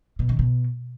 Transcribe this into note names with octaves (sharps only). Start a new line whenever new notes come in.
B2
D#3
B2